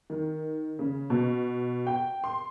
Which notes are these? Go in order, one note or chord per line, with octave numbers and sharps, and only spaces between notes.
D#3
C#3
B2
G5
C6